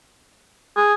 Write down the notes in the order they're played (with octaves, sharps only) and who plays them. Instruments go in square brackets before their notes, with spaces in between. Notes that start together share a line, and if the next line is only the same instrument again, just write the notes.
[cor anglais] G#4